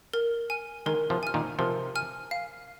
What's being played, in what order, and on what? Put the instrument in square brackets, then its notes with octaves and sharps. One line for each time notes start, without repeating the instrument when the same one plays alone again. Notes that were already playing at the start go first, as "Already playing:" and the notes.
[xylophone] A#4
G#5 F6
[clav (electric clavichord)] D#3 G#3 [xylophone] A#4
[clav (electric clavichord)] C3 F3
[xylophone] G#5 F6
[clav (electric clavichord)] A#2 D#3
[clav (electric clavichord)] C3 F3 [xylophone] A#4
[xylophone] G#5 F6
F5